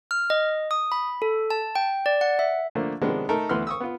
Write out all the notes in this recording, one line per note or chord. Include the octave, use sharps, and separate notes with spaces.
F6
D#5
D#6
B5
A4
A5
G5
D5
F#5
E5
D3 F3 A3 A#3 D4
C3 D#3 F3 G#3 B3 D4
A3 D#4 A4 A#4
D2 E3 B3 B5 C6 F6
C#6 D#6 E6
B3 F4